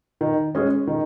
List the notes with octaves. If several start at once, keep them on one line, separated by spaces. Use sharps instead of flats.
D#3
G#3 C#4 G#4
D#3